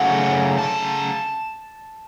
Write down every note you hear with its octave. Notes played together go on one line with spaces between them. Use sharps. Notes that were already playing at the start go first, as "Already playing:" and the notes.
Already playing: C#3 F#3 A3 C#4 F#5
A5